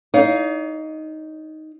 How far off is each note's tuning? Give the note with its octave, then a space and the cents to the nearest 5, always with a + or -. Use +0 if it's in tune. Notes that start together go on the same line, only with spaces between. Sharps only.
D#4 +5 C#5 +45 F5 +0